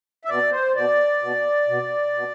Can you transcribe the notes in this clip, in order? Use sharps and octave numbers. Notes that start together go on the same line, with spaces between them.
E5
B2 D5
C5
B2 D5
B2
B2
B2